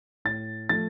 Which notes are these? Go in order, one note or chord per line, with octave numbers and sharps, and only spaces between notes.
A2 A6
F3 A3 A6